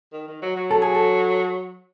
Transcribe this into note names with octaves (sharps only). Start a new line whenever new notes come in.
D#3
D#3
F#3
F#3
A4
G#4
A4